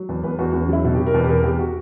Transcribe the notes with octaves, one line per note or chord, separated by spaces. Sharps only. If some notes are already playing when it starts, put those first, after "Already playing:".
Already playing: F#3
E2
E2 B4
E2 F#4
E2 F#4
C#4
F#3 E4
B2 F#4
B2 G4
A#4
E2 B4
G4
E2 A#4
E2 G4
F#4